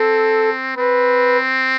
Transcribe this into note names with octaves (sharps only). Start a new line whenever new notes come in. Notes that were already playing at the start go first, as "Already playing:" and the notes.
Already playing: C4 A4
C4 B4